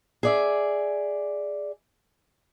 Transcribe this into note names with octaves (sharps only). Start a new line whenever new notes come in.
G#4 D5 E5